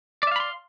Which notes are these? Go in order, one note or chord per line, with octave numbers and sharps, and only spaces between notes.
D5 E5 F5 B5 C6